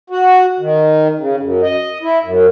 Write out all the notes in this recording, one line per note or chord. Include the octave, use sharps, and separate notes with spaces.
F#4
D#3
C#3
F#2
D#5
E4
F#2